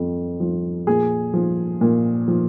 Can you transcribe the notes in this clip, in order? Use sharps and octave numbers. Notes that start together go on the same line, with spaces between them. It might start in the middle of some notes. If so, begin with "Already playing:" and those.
Already playing: F2 F3
F3
A#2 G#4
F3
A#2
F3